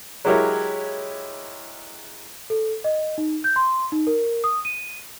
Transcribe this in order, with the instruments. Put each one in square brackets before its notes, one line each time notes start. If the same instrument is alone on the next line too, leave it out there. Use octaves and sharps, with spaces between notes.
[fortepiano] F#3 G#3 E4 G4 A#4 C#5
[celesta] A4
D#5
D#4
G6
C6
D#4
A#4
D#6
D#7